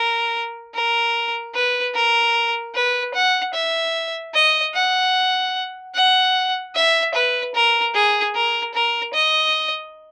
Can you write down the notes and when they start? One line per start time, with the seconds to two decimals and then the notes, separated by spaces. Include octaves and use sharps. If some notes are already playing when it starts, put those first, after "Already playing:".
Already playing: A#4
0.74 A#4
1.54 B4
1.94 A#4
2.74 B4
3.14 F#5
3.54 E5
4.34 D#5
4.74 F#5
5.94 F#5
6.75 E5
7.14 B4
7.54 A#4
7.94 G#4
8.34 A#4
8.74 A#4
9.14 D#5